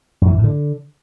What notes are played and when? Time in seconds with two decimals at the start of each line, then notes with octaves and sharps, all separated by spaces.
0.22 F#2
0.27 E3
0.33 A#2
0.38 A2
0.44 D3